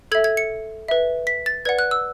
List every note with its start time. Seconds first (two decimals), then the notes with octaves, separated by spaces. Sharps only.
0.12 A4 E5 G#6
0.24 G#6
0.37 C#7
0.88 B4 E5
1.27 B6
1.46 A6
1.65 B4 D5 F#5 G#6
1.79 F#6
1.91 E6